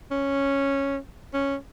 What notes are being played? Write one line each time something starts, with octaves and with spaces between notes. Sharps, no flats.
C#4
C#4